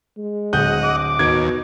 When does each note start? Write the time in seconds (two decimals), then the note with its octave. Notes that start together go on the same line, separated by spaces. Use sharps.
0.17 G#3
0.53 D1 D#5 F#5 G6
0.84 D6
1.19 D#2 B2 G#6 D7